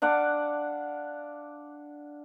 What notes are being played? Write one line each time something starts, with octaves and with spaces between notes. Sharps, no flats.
D4 F5 F#5 D6